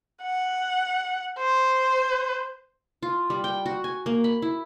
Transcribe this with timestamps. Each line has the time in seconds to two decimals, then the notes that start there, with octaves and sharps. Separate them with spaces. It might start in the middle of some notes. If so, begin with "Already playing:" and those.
0.23 F#5
1.39 C5
3.02 F4
3.30 G3
3.44 G5
3.66 F#4
3.84 G#5
4.06 A#3
4.24 B5
4.42 E4